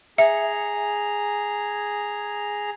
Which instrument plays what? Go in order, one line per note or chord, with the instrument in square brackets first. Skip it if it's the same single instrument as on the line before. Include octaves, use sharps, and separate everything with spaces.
[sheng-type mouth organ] G#4 A#5 [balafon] E5